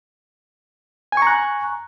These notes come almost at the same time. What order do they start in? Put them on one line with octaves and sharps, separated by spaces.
G#5 C#6 A#5 F#6